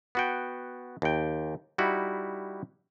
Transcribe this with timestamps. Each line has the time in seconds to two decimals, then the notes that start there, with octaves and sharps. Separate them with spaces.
0.15 B3 F#4 G5
1.02 D#2 G5
1.78 G3 D#4 E4 F#4